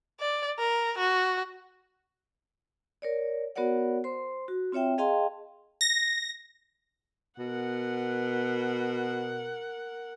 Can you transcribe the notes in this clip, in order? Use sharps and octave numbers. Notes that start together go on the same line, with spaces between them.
D5
A#4
F#4
A#4 C#5 D5
B3 F#4 A#4 C#5 D5 F#5
C5 C6
F#4
C4 F4 C#5 E5 G5
G#4 D#5 F5 G5 A5 C6
A#6
B2 A#4 F#5